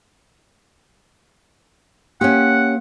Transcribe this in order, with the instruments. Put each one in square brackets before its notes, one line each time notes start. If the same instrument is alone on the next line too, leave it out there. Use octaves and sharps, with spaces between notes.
[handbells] A#3 [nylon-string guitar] C#4 G4 [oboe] F#5